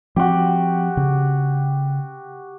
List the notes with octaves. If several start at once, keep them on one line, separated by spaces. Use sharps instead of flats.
F3 C4 F#4 G4
C#3